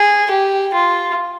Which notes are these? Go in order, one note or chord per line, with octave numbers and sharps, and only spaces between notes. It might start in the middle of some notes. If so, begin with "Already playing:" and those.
Already playing: G#4
G4
F4